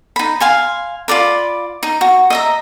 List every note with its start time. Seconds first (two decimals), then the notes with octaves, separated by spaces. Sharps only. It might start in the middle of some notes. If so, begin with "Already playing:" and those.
0.16 D#4 B5
0.40 F5 G#5 C6
1.08 F4 A#4 D5 B5
1.83 D#4
2.01 F#4
2.30 D#5 E5 A#5